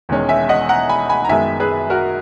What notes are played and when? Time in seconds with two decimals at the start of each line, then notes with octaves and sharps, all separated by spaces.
0.09 E1 E2 D#3 G#3 C#4
0.29 E5 G#5
0.49 D#5 F#5
0.69 F#5 A#5
0.89 G#5 B5
1.09 G#5 B5
1.25 A#5
1.29 F#2 D#3 G#3 B3 E5 G#5
1.60 G#4 B4
1.90 F#4 A#4